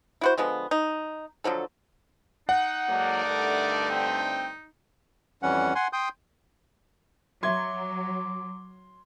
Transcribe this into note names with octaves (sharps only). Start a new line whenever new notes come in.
E4 F#4 C5
D3 F3 G#3 B3
D#4
D3 F3 F#3 A4
D#4 F#5
G#2 F#3 A#3 A4 A#4 D5
G2 D3 A3
C4 G5
F2 E3 G3 C#4 F#5
F#5 G#5 C6
G5 C6 D#6 G6
F#3 F#4 E5 C6 D6 G#6